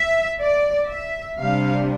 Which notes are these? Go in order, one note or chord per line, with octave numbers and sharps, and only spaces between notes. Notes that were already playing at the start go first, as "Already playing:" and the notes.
Already playing: E5
D5
E5
C3 G3 D4 F5